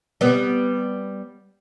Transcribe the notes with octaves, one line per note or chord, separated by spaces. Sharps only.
G3 B3